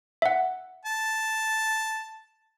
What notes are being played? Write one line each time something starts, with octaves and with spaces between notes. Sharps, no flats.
E5 F#5
A5